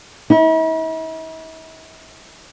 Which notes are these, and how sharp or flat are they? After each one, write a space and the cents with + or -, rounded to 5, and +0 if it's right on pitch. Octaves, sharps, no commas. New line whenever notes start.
E4 -45